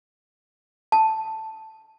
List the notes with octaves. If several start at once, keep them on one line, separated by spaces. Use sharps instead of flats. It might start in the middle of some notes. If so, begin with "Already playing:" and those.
A5